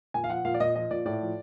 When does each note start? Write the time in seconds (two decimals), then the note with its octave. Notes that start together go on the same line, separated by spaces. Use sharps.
0.14 A#2 G#5
0.24 F5
0.30 F3 F#5
0.45 A#2 F5
0.54 D5
0.60 A#2 D#5
0.75 F3 D#5
0.91 A#2 D5
1.05 A2 D5
1.22 F3